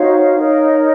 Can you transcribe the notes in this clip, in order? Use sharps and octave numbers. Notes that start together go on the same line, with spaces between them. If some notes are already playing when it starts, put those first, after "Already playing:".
Already playing: D#4 F#4 C5 C#5 F5
D#4 A#4 C#5